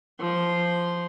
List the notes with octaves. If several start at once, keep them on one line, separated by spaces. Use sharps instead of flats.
F3 C6